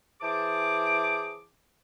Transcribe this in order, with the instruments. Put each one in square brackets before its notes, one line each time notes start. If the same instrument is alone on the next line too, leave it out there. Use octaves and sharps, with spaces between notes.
[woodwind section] E3 G#4 C5 A5 D6